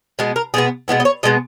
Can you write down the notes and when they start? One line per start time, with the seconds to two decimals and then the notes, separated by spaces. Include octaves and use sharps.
0.19 B2 G#3 B3
0.36 A#4
0.54 B2 G#3 B3 G#4
0.88 B2 G#3 B3 E4
1.00 D#5
1.05 C#5
1.23 B2 G#3 B3 D#5